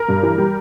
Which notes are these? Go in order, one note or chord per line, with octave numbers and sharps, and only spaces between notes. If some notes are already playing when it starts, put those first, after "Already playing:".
Already playing: A#4
G2
E3
G3